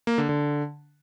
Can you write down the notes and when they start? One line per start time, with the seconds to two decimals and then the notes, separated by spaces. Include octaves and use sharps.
0.07 A#3
0.18 D3
0.29 D3